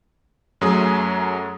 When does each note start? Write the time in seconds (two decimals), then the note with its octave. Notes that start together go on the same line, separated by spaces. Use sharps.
0.61 F#2 F#3 A3 G#4 D#6